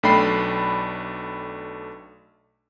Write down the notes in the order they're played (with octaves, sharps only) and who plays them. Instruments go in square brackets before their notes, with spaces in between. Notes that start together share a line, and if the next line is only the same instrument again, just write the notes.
[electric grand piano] B1 A3 D4 G5 B5 C7